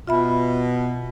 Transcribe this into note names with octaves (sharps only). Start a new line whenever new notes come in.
B2 F4 E5 B5